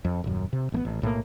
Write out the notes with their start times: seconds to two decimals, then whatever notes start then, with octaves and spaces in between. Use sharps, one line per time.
0.05 F2
0.24 D#1 F#2
0.53 C3
0.72 A1 A3 B3
0.85 A1
1.02 B1 A2 E3 A#3